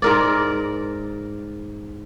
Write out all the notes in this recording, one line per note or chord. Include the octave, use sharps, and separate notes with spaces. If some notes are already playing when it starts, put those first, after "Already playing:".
G#2 A#4 D5